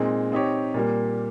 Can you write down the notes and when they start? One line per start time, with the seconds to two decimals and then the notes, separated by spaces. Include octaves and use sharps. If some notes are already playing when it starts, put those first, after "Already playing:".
Already playing: A#2 G#3 C4 D#4
0.32 C4 D#4 G4 C#5
0.74 A#2 G3 A#3